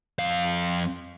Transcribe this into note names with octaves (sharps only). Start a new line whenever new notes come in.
F2 F5